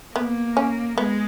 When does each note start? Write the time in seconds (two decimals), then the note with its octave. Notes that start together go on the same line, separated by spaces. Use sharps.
0.15 A#3 B3
0.57 C#4
0.98 G#3 B3